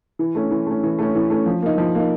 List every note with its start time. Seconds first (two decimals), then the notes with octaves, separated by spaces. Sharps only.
0.19 E3
0.35 A3 C#4
0.51 E3
0.66 A3 C#4
0.83 E3
0.99 A3 C#4
1.15 E3
1.30 A3 C#4
1.46 F3
1.62 A#3 D#4
1.78 F3
1.95 A#3 D#4